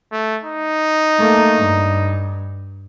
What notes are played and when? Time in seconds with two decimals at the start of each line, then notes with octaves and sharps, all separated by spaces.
0.12 A3
0.44 D#4
1.19 A3 A#3
1.57 G2